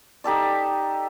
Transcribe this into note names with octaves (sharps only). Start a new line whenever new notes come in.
D#4 G4 A4 D5